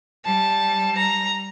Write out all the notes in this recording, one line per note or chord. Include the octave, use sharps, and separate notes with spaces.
G3 A5
A#5